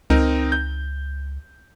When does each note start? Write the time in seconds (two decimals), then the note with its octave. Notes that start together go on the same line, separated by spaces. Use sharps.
0.10 C#2 C4 D#4 A#4
0.52 G6